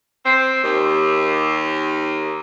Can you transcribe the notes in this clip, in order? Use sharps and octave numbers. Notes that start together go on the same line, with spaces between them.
C4
D#2